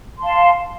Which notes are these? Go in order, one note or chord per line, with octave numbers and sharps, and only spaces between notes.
F5 A5 C6